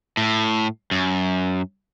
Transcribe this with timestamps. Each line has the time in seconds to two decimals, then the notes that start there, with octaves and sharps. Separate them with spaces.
0.17 A2
0.91 F#2